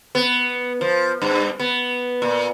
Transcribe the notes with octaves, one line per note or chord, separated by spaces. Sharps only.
B3
F3
G2
B3
A#2